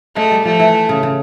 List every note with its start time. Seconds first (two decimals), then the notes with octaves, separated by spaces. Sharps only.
0.16 G#3 A3
0.31 G3
0.45 F3 A3
0.60 E3
0.89 C#3
1.03 C#3